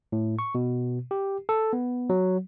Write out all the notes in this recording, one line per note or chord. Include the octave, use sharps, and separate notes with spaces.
A2
C#6
B2
G4
A4
B3
F#3